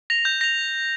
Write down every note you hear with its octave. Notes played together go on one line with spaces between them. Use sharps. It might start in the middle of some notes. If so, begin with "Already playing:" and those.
A#6 F7
G6
A#6 F7